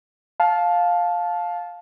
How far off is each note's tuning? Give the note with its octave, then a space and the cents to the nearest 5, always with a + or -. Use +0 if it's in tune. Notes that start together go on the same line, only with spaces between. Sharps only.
F5 +15 A5 -15